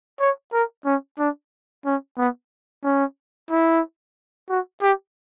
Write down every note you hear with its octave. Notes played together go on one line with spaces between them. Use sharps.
C#5
A#4
C#4
D4
C#4
B3
C#4
E4
F#4
G4